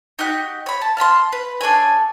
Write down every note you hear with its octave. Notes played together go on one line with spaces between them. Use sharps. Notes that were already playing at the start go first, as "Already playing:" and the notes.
D#4 F#4 G4 F#6
C#5 B5
A5
F5 A5 B5 C6
B4
D4 A4 C#5 G#5